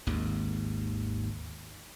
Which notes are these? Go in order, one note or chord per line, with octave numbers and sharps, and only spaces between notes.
G#1 D#2